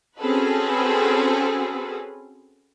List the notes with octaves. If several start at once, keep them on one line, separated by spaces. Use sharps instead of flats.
C4 C#4 F#4 G#4 A4 B4